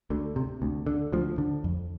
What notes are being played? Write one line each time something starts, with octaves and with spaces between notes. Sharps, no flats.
D2 D3
C3
D2
D3
D2 F3
D3
F2